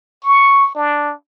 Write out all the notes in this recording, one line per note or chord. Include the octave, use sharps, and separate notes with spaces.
C#6
D4